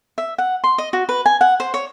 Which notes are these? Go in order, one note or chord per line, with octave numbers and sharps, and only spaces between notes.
E5
F#5
C6
D#5
F#4
B4
G#5
F#5
C5
C#5